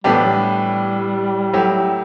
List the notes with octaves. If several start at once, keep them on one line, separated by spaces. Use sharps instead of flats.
A2 E3 G3 B3 D4 G4
F#3
G3
F#3 A3 E4 G4